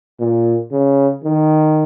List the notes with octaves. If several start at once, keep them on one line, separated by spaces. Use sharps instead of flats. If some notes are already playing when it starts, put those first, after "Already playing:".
A#2
C#3
D#3